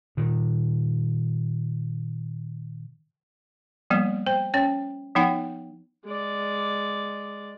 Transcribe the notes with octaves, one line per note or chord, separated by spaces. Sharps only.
A#2 D#3
F3 G3 A#3 B3
C5 G5
C#4 C#5 G5
F3 B3 D#4 F#5 G5
G#3 D5